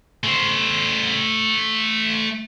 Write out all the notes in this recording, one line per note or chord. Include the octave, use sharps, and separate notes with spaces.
A3 C5